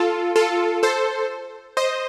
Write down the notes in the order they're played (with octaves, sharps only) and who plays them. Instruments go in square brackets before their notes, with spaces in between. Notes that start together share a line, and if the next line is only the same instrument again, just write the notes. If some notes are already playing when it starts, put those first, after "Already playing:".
Already playing: [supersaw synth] F4 A4
F4 A4
A4 C5
C5 D#5